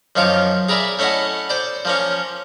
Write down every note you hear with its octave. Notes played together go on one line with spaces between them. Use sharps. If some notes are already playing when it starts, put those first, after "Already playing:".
F#2 D#3 F3 F4 C#5 D6
G#4 A#4 B4 D5 E5
A3 C#4 E4 D#5 F#5
C5 D5
F3 A#3 C#4